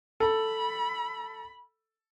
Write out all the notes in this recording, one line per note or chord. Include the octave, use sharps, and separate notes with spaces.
A4 B5